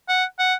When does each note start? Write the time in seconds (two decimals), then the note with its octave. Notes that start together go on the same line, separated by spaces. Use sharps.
0.09 F#5
0.39 F#5